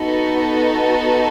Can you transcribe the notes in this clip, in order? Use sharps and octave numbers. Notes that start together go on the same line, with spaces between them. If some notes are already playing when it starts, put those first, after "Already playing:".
Already playing: B3 D#4 F#4 A4